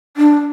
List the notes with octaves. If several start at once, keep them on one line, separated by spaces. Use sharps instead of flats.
D4